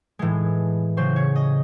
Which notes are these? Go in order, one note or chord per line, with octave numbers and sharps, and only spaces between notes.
A2 E3 G#3
C#3 F#3 C5
C#5
D#5